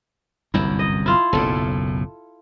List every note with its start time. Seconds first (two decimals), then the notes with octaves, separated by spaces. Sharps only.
0.54 G1 C2 F#2 E4
0.79 D#5
1.06 E4 F4
1.33 F#1 B1 A2 A4